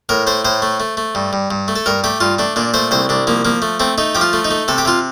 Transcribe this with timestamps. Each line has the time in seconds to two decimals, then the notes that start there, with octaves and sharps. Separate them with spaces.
0.09 A2 A#4
0.27 A3 C5
0.45 A2 C5
0.62 A3
0.80 A3
0.97 A3
1.15 G2
1.33 G2
1.51 G2
1.68 A3
1.76 A4
1.86 G2 A#4
2.04 A3 G4
2.20 G2 F4
2.39 A3 D4
2.56 A#2 D4
2.74 A3 C5
2.91 C2 C5
3.09 C2 D4
3.27 F3 A#3
3.45 F3 A#3
3.62 A3
3.80 A3 C4
3.98 A3 D#4
4.15 F3 G4
4.21 F4
4.33 A3
4.45 D#4
4.51 A3
4.68 C3 A4
4.78 G4
4.85 C3 F4